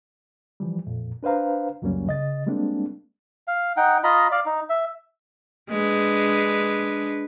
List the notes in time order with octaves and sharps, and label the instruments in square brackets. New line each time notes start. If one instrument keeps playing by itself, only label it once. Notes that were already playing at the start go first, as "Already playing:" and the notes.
[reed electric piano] E3 F3 G3
F2 A#2
D4 B4 C5 F5 A#5
C#2 F#2 F#3 G3 A#3 C#4
C#3 D#5 A6
G3 G#3 A#3 C4 D4
[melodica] F5
D#4 F#5 G5
F4 D#5 A#5 B5
D5 F5
D#4
E5
[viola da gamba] G#3 D4 B4